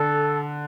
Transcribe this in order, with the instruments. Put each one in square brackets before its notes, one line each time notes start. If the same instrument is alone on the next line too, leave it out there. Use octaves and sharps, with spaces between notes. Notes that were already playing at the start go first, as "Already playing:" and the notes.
Already playing: [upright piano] D3 [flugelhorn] A4